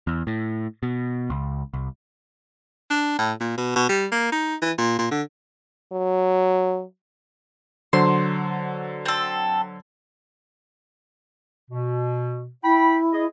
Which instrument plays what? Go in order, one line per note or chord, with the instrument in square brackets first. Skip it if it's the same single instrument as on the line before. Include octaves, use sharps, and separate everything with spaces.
[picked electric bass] E2
A2
B2
C#2
C2
[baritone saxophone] D4
A2
A#2
B2
B2
G3
A#3
D#4
E3
A#2
A#2
D3
[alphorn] F#3
[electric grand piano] D3 F#3 C5 [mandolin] C6
[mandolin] C4 A4
[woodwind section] B2
[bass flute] E4 [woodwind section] G5 B5
[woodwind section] G#4 D#5